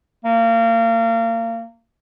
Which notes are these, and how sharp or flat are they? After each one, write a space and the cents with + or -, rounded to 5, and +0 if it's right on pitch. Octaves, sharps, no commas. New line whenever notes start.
A#3 -30